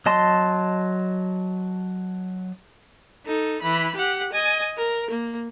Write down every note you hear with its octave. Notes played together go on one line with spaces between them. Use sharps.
F#3 D#5 A5 C6
D#4 A4
E3 B5
G4 F#5
D#5 G#5
A#4
A#3